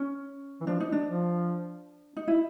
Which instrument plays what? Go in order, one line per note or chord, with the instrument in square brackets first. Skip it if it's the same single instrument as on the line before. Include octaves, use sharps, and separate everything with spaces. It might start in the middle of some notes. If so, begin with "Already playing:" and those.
Already playing: [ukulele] C#4
[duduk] E3
[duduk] F3 [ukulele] D4
[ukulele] D#4
D4
[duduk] F3
[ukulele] D#4
E4